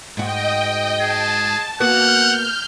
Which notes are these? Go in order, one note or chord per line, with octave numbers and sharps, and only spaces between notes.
G#2 F#4 D#5 G5
G#4 A5
A#3 B3 F#4 F#5 F6 G6